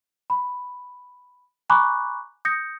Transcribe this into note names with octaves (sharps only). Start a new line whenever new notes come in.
B5
G#5 A#5 B5 C#6 D6 F#6
D#6 G6 A#6 C#7